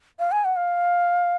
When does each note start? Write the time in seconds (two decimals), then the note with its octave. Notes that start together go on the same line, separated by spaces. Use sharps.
0.19 F5
0.32 G#5
0.45 F#5
0.56 F5